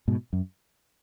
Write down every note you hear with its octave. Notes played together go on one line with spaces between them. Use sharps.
G#2 B2
F#2